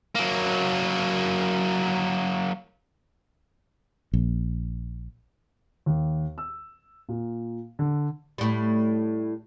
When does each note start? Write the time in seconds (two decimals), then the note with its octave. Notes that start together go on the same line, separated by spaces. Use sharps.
0.15 F#3 A#3
4.13 A#1
5.86 D#2
6.38 E6
7.09 A#2
7.79 D3
8.38 A2 G3